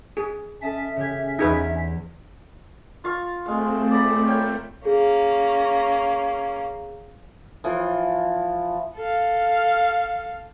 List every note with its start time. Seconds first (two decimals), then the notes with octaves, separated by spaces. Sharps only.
0.17 G#4
0.62 C#4 A4 D#5 E5 A5
0.96 C#3 G4 G#6
1.39 E2 D#4 G#4 B4 G#6
3.04 F4 F5 C#6
3.46 G#3 A3 C4 F5
3.91 D5 A#5 B5
4.26 A3 A#4 C#5 G5
4.85 A#3 C#4 G#4
7.64 E3 F3
8.97 A4 F5